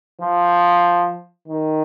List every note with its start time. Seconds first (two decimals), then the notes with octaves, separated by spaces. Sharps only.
0.21 F3
1.48 D#3